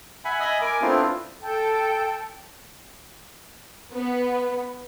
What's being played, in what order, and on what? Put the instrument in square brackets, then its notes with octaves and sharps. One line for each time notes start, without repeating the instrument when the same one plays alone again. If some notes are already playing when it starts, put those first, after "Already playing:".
[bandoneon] E5 F#5 G#5 B5
D#5 E5 G#5 B5 D#6
A#4 G#5 D6
A3 B3 C4 D4 E4 F4
[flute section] A4 G5
[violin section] B3